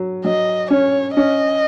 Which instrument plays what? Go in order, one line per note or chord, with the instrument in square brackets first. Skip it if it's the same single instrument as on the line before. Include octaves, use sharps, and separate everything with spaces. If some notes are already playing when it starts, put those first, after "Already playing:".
Already playing: [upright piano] F#3
[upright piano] F#3 [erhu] D#5
[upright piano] C#4 [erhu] C#5
[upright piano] C#4 [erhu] D#5